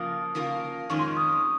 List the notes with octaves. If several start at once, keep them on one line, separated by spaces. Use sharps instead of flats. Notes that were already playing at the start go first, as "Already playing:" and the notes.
Already playing: C#3 F3 A#3 F4 A#4 D#6
C#3 F3 A#3 F4 A#4
F2 D#3 G#3 C#4 F4 C#6
C6
C#6
D#6